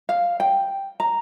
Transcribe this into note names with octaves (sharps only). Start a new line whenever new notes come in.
F5
G5
A#5